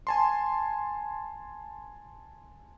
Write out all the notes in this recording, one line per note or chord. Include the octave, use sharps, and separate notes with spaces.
G#5 A5 C6